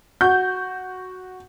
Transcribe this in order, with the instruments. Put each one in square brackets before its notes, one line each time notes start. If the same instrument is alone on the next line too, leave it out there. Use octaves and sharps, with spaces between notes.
[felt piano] F#4 [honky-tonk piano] G6